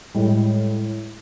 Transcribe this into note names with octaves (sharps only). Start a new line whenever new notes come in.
A2 G3 G#3